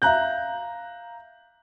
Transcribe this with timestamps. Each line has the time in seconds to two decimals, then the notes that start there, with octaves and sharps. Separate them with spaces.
0.02 E5 F5 A#5 F#6 G6